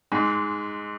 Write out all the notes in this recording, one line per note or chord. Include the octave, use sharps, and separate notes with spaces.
G#2 G#3